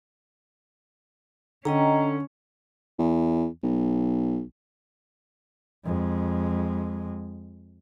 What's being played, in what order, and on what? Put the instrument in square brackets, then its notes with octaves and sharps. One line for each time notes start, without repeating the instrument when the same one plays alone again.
[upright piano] D3 [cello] C#4 [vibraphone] D#5 G5 A#5
[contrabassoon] E2
B1
[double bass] F2 G#3